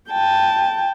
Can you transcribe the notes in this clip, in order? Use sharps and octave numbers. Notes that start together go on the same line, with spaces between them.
G5 A5